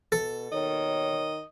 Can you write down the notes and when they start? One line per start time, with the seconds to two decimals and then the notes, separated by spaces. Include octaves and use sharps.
0.12 B2 A4
0.52 D#2 B2 D#3 C#5 D#5